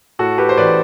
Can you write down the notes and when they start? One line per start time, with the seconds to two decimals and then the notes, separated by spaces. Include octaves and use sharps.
0.19 A2 F#4 A4
0.38 G4 B4
0.49 C5
0.58 A1 B4 D5